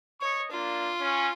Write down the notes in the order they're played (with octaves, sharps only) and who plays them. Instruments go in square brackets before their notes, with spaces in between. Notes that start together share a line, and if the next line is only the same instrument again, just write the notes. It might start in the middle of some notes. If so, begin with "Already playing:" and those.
[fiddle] C#5 [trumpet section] D#5 C#6
[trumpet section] A#3 D4 [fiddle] F4
[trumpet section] C#4